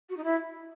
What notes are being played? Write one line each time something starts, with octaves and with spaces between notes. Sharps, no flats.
F#4
D#4
E4